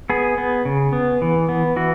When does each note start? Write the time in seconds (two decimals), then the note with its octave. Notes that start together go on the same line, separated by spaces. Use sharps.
0.10 B3 G#4
0.38 B3
0.65 C#3
0.93 B3
1.22 E3
1.49 B3
1.76 E3 F#4